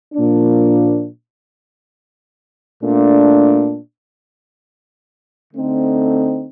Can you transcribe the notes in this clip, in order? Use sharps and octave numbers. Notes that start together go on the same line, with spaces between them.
A#2 F3 A#3 D4
A#2 A3 D4
D3 A3 C4 D#4